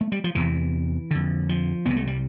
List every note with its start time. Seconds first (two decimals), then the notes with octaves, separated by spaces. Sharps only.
0.01 A3
0.12 G3
0.24 F3
0.35 E2 C3 E3
1.11 F2 D3
1.49 F3
1.86 C2 C3 B3
1.97 A3
2.07 G3